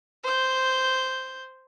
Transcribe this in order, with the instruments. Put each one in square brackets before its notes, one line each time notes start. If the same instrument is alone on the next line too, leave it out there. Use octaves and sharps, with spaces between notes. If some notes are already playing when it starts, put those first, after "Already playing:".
[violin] C5 G6